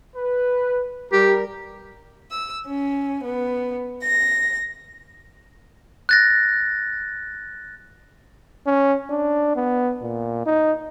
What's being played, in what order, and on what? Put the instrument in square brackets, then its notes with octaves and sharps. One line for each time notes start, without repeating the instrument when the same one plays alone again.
[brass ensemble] B4
[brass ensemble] G3 A#4 [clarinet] G4
[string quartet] E6
C#4
B3
A#6
[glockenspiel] F#6 A6 A#6
[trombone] C#4
D4
B3
A#2
D#4